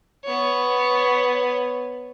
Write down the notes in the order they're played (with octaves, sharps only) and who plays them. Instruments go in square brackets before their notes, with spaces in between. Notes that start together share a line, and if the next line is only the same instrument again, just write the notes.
[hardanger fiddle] B3 C#5